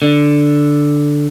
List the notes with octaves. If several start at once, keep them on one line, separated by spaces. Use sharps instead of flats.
D3